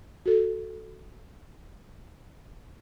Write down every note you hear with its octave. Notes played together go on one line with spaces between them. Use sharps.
F#4 A4